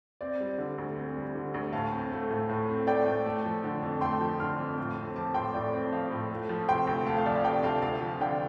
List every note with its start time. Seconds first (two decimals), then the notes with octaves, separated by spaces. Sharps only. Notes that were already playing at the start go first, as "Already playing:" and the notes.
0.21 C4 D5
0.40 G3
0.58 D3
0.78 D2
0.96 C4
1.16 G3
1.35 D3
1.54 D2
1.73 A2 F5 A5
1.92 C4
2.11 A3
2.30 A2
2.49 A2
2.69 C4
2.87 A3 D5 G5
3.06 A2
3.26 A3
3.45 F3
3.64 D3
3.82 F2
4.01 A3 G5 C6
4.20 F3
4.40 D3 C6 F6
4.59 F2
4.78 A2
4.97 C4
5.16 F3 A5 D6
5.34 A2 G5 C6
5.54 A2 D5
5.73 C4
5.92 F3 F5
6.11 A2
6.31 A3
6.49 F3
6.69 C3 G5 C6
6.87 D2
7.06 A3 F5 A5
7.16 F5
7.26 F3 D5
7.35 F5
7.44 C3 D5 G5
7.63 D2 F5 A5
7.82 D2 F5
8.01 F3
8.20 D3 D5 G5